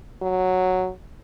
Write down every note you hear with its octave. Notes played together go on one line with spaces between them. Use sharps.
F#3